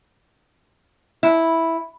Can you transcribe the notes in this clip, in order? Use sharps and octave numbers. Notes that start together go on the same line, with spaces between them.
E4